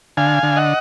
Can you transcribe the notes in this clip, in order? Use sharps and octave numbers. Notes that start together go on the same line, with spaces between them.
D3 F5 G#5
D3
D#5 F#5